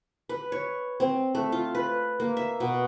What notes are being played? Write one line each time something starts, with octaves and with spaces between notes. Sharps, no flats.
B4
C#5
C4
A3
F4
B4
A#3
E5
B2